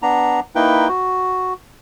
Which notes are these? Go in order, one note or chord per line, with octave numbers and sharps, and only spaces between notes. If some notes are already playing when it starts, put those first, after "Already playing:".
B3 D4 A#5
A#3 D#4 E4 B4 G5
F#4